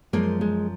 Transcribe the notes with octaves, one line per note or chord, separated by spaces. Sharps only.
F#2 F3 G#3 A#3
G#3